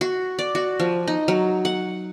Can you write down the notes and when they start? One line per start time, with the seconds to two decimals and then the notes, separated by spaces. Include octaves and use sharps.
0.01 F#4
0.39 D5
0.55 F#4
0.80 F3
1.08 D#4
1.28 F#3
1.65 F#5